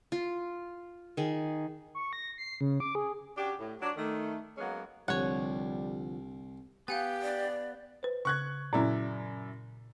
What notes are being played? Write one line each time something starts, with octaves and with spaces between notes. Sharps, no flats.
F4
D#3 G#4
C#6
A#6
C7
C#3
D6
G#4
C#4 D4 F#4 G4
A2
F#3 D4
D#3 A3
F#3 G#3 A#3 B3 C#4
C2 D3 F3 G3 C#5 F#5
B3 G4 F5 F#5 G#5
D5
B4 C5
C#3 C#6 F#6 G#6
F#2 A#2 E4 D5